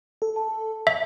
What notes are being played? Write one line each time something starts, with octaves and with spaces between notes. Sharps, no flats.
A4
A5
E5